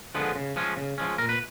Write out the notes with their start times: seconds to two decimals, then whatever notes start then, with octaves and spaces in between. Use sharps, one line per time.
0.15 D3 F3 G#3 B3
0.36 C#3
0.56 F3 G#3 C#4
0.77 C#3
0.98 F3 G#3 C#4
1.18 A#2 A#4
1.29 B4